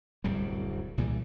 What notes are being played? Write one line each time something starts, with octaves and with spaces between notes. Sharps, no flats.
D1 C2 F#2 G3
C2 A#2 E3 G3